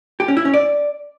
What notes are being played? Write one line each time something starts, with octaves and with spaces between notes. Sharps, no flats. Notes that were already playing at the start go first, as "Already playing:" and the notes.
G4
C#4
E4
C#4
D5